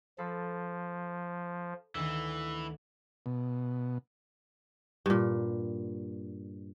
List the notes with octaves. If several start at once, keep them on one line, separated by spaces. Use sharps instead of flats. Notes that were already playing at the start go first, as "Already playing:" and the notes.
F3 A4 B5 C7
D2 D#3 E3
B2
G2 A#2